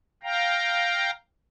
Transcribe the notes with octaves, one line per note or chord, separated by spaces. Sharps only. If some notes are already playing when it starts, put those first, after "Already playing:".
F5 G5 A#5